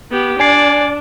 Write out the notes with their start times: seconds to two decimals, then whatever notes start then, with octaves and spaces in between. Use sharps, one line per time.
0.11 B3 G4
0.40 D4 D5 G#5 G#6 C7